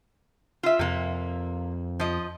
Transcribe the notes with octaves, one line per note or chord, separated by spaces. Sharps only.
F4 E5
F2 C3 A#3
F3 D#5